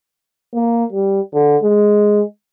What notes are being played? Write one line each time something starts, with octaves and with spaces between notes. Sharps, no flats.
A#3
G3
D3
G#3